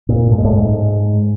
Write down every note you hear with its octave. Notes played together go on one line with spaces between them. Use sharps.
A#2
A2
G#2
A2
G#2